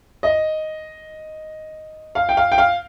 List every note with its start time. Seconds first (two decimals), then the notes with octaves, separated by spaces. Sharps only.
0.23 D#5
2.15 F5
2.29 G5
2.37 F5
2.52 G5
2.58 F5